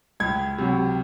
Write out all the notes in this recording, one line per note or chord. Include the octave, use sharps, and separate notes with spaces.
C#2 G#6
C3 F#3